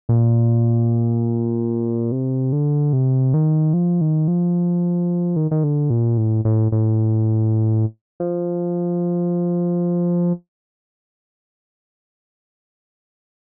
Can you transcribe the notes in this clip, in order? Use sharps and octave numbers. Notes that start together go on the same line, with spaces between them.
A#2
C3
D3
C3
D#3
F3
D#3
F3
D#3
D#3
D3
A#2
A2
A2
A2
F3